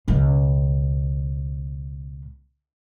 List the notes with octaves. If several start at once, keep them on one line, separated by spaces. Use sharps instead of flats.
C#2 B2